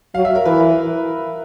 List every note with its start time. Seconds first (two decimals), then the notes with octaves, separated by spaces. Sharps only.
0.15 F#3 F5
0.25 E5
0.35 A#4
0.45 E3 B4